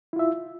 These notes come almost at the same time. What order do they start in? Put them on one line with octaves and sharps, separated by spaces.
E4 F4 E5